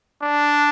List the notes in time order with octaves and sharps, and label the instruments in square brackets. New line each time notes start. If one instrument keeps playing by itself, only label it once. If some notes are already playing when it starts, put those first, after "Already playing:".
[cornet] D4